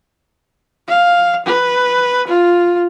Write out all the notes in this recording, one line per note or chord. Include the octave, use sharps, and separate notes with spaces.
F5
B4
F4